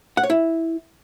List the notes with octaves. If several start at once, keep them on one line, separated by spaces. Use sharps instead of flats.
F#5
C#5
E4